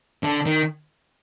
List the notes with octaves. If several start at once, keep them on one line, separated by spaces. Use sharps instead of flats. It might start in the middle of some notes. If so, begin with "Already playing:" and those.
D3
D#3